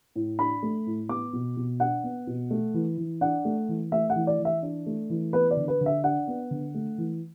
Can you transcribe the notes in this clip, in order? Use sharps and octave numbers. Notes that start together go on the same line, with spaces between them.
A2
D4 B5
A3
A2
B3 D6
B2
B2
D4 F#5
B3
B2
A3
E3
E3
D4 F#5
A3
E3
A3 E5
F#5
E3
D5
E3
E5
D4
A3
E3
B3 B4
D5
D3
B4
D3
E5
D4 F#5
B3
D3
A3
E3